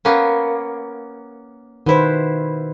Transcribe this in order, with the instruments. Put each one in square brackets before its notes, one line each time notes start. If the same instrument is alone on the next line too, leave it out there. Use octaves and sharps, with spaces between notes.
[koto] A#3 B3 C#4
[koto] B2 E4 [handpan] D#3 B4 C5